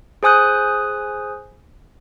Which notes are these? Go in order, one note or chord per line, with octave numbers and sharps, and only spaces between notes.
G#4 C5 G#5 D#6 F#6 G6